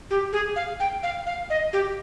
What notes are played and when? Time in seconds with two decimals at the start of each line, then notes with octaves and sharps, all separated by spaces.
0.11 G4
0.33 G#4
0.56 F5
0.80 G5
1.03 F5
1.26 F5
1.50 D#5
1.73 G4